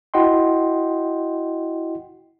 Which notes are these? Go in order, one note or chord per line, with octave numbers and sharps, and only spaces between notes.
E4 F#4 D#5 F#5 G5 C6